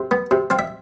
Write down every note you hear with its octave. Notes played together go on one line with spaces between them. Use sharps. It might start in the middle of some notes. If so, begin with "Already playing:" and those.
Already playing: C3
B3
C3
C4 F5
E5